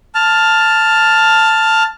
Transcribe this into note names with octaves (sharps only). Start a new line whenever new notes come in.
A5 F6